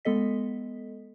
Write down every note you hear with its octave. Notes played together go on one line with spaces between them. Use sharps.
G#3 B3 A4 D#5 B6